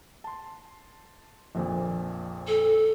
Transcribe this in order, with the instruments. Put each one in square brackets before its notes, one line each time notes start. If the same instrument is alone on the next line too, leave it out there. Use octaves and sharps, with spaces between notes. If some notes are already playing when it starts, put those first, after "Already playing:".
[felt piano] A5 C6
A#1 F2 A#2
[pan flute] A4